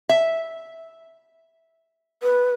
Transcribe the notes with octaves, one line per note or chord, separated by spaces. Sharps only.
E5
B4